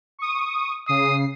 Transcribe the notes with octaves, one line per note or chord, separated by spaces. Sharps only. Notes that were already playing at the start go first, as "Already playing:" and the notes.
C#6 D#6
C#3 D#6 C7